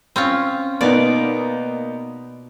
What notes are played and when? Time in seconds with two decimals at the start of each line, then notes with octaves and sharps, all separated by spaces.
0.16 C4 C#4 F4
0.81 B2 A#3 B3 D#4 D5